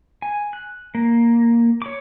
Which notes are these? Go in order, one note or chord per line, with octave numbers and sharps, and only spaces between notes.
G#5
F#6
A#3
C#5 D6